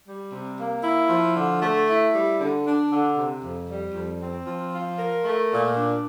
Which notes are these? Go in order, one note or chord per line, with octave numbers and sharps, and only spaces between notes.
G3
C3
A#3
E4
F3
D3
A3
E4
G3
D3
D4
D3
C3
F2
G3
F2
C4
F3
F4
A#4
A3
A#2
D4